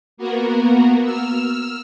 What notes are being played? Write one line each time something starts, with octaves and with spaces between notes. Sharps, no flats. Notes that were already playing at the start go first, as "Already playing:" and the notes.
A#3 B3 F#4 A#4
E6 F6